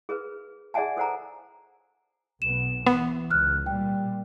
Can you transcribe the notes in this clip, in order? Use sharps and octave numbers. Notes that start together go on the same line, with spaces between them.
G#4 A#4 B4
G#4 D5 E5 F#5 G#5 A5
A4 A#4 C5 F#5 G#5 A#5
B1 B3 E7
E3 B3
C#2 F6 F#6
A#2 G3 G5